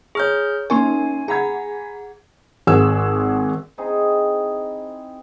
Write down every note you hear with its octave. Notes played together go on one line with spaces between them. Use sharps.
G#4 C#5 A#5 C#6 F6 G6
A#3 C#4 D#4 A#4 G#5 C6 C#6
G#4 F#5 A#5 B5 G#6
G#1 G#4 F#5 E6 E7
C4 D#4 E4 G#4